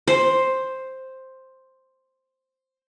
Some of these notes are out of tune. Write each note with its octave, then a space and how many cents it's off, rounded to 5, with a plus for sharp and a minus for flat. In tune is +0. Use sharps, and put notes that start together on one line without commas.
C5 +5